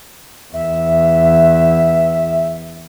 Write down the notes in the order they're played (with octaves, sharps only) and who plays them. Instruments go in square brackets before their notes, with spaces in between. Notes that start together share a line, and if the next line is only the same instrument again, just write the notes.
[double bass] E2 [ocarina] E5